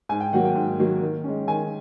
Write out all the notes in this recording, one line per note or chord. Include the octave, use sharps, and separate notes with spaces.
G#2 G#5
G5
D#3 F#3 A#3 F#5
G5
G#2
D#3 F#3 A#3
D#3
G#3 C#4
D#3 G#5